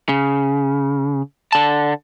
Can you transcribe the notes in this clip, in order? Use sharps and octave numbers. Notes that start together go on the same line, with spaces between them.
C#3
D3 A5